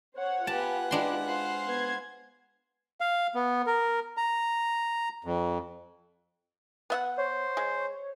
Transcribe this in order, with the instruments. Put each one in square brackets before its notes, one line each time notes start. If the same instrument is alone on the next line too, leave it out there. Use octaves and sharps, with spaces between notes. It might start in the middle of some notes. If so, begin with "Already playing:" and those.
[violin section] C5 C#5 F#5
[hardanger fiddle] B3 G4 [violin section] F4 B4 [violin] F#5 G#5 [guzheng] A5
[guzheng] G#3 D4 C6 [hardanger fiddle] E4 G4
[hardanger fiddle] C5 F5
[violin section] B3 G#6
[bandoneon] F5
B3
A#4
A#5
F2
[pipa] B3 E5 F#5
[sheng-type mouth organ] C5 [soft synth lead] C#5
[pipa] G#3